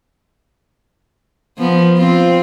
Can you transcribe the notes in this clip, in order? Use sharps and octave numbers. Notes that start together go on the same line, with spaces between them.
F3 B3
C4 F4